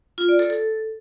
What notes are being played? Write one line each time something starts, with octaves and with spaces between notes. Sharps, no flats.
F4
D5
A4
A4